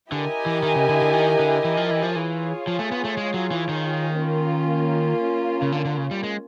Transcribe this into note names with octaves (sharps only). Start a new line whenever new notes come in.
D3 E4 G4 A#4 D#5 G#5
E3
D#3
C#3
D3
D3
D#3
D3
E3
F3
E3
F3
E3 F4 G#4 C#5
F3
A3
B3
A3
G#3
F#3
E3
D#3
A#3 C#4 F4
C#3
D3
D3
C#3
G3
G#3